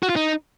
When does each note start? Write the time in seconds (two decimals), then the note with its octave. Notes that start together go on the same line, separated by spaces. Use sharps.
0.03 F#4
0.09 F4
0.16 D#4